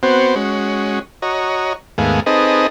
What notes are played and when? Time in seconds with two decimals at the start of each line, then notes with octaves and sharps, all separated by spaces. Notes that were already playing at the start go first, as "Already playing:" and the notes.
0.03 B3 C4 F#4 C5
0.36 G#3 C#4 F#4
1.22 F#4 C#5 D#5 A#5
1.98 D#2 G#2 A3 B3 G#4 F5
2.26 C4 D#4 G#4 A4 B4 D#5